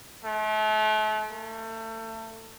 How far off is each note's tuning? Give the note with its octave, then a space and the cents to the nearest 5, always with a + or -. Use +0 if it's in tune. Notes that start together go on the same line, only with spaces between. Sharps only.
A3 -35
A3 +30